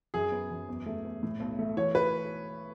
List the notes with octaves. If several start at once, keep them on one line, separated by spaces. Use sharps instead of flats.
F#2 G#4
B3
F#2
E2
A3
E2
A2
B1
A3
E3 C#5
B4